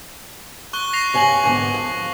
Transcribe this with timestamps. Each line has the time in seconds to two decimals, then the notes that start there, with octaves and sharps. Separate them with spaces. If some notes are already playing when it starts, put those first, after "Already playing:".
0.73 C#6 F#6 G7
0.93 A#6 C7 F7
1.14 G2 C#5 G#5 C#6 F#7
1.44 G#2 D3 B3
1.74 F3